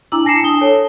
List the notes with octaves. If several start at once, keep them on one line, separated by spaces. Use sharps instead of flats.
D4 E4 A#5 D6 E6 F#7
G#5 A5 A#6 C7 C#7 E7
D4 D#6 G7
A4 C#5 A5